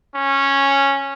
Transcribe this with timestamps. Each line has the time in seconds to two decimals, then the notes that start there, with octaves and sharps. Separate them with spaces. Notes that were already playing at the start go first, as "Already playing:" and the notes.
0.15 C#4